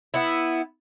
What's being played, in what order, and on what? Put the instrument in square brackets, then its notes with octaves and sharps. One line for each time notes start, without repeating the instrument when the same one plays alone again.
[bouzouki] B3 E4